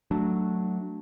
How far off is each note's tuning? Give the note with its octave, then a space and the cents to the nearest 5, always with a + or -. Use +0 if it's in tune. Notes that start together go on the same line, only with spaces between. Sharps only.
F#3 +0 A3 +0 D4 +0